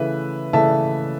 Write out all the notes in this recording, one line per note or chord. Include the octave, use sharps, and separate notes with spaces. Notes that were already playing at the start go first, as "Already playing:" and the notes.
Already playing: C#3 E3 A3 B4 E5
C#3 E3 A3 E5 A5